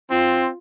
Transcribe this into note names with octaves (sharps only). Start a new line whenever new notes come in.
C4 F4